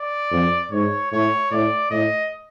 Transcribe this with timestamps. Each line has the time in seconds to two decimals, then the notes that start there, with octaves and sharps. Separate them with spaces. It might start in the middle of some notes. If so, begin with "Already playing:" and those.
Already playing: D5
0.31 F2
0.71 G#2 C#5
1.11 A2 C#5
1.51 A2 D5
1.90 A2 D#5